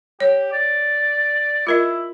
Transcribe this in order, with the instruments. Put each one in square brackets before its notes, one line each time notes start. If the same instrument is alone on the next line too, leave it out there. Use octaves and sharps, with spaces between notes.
[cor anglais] G4 [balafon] C#5
[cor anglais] D5
[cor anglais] E4 [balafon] F4 A#4 D#5